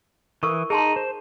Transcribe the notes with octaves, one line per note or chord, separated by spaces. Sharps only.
E3 A#4 C#6 D#6
D#4 G#4 A5 C6
C5